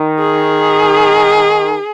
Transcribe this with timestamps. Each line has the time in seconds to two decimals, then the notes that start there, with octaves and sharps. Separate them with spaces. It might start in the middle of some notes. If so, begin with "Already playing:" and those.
Already playing: D#3
0.19 G#4